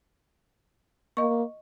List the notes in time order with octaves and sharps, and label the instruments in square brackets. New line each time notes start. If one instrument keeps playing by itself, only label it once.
[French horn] A#3 [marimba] D#5 C#6